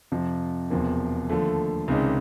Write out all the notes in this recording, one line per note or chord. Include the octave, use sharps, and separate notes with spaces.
F2 C3 F3
E1 E2 C3 F3 A#3
D#2 D3 F3 A3
C#2 C3 D#3 G#3 C#4